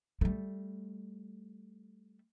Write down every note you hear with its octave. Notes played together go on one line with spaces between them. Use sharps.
G3 A3